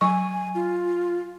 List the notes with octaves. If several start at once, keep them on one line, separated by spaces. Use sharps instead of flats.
F#3 G#5 C#6
F4